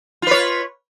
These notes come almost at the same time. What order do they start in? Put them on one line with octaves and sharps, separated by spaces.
F4 B4 C#5